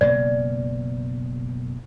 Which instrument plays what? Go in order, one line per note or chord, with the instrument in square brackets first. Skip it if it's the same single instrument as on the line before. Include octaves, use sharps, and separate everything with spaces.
[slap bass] F#1 B2 A#3 [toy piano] D5